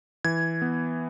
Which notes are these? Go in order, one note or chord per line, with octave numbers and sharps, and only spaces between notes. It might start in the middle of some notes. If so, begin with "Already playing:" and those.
E3 G#6
B3